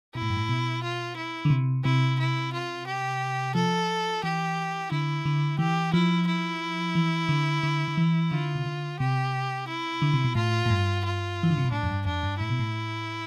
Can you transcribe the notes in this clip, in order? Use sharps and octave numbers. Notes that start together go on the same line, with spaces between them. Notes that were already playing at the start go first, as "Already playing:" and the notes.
B2 E4
A2
G2
A2
B2
F4
E4
D3
C3
C3 E4
E4
F4
G4
F3 A4
E3 G4
D3 E4
D3
E3 G4
F3 E4
E4
E3
D3
D3
D3
E3
D3 F4
C3
D3
C3 G4
E4
D3
C3
B2
A2 F4
A2
G2
F4
E3
D3
C3
B2
A2 D4
F2
G2
F2 D4
G2
A2 E4
B2
A2